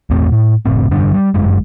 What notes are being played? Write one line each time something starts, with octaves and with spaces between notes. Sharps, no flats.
A1 E2 A3 C4
A2
F#1 A2 C4
F1 G2 D3 D4
G3
G1 F#2 G#3